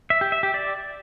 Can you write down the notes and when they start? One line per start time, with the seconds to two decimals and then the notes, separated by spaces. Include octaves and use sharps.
0.10 E5
0.21 G4
0.32 E5
0.43 G4
0.54 D5